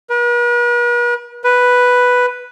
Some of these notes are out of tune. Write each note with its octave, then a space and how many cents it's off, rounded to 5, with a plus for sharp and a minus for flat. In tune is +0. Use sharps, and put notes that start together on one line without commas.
B4 -45
B4 +0